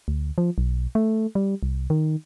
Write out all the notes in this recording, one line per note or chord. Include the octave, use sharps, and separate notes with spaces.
D2
F3
B1
A3
G3
C2
D#3